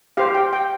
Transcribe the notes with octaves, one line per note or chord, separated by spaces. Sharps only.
G4 C5 F5
G5
G5